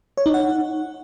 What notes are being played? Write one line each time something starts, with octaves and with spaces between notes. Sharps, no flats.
C#5
D#4
F#5